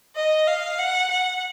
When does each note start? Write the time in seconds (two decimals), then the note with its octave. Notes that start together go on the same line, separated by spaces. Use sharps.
0.16 D#5
0.47 F5
0.79 F#5
1.11 F#5